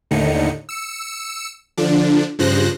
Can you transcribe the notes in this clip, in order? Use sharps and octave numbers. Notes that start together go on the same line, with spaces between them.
D#2 A2 D3 D#4 C#7
E6 C#7
D3 F3 D4
G2 C#3 F3 C5 F#6 A#6